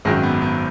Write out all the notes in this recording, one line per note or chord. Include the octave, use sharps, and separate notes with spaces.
G#1 F#2 D#3 F#3 G#3
B3
B3